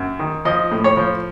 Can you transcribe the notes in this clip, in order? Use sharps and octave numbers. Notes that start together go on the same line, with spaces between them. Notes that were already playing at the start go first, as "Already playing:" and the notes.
Already playing: F#2
D#3
F3 D#5
A2
C#5
F3